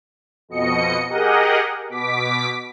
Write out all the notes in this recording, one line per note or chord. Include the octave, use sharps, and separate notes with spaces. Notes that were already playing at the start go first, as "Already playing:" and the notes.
F2 B2 D#5 C#7
G4 G#4 A#4 D#5 F#5
B2 D6 B6